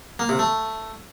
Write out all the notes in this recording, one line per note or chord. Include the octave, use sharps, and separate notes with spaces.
A#3
C3
A3